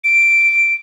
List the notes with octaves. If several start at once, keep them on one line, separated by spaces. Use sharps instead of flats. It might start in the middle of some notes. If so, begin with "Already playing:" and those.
D7